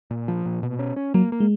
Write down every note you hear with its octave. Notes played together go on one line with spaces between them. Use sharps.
A#2
F3
A#2
B2
C#4
C#4
F#3 A#3
A#3
G#3